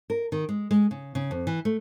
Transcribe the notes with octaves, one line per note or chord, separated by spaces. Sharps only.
A#4
D#3
G#3
G#3
C#3
C#3
F2
E3
A3